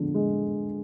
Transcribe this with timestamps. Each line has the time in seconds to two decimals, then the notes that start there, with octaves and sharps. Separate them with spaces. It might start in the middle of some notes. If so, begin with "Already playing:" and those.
Already playing: D3 F3 G#3 B3
0.14 G#3